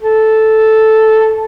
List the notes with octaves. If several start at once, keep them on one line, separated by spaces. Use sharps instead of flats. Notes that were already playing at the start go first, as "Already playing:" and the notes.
A4